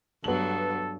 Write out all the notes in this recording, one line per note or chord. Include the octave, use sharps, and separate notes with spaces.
G2 F#3 B3 A4 F#7